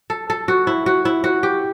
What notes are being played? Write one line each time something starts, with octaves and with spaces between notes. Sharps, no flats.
A4
A4
F#4
E4
F#4
E4
F#4
G4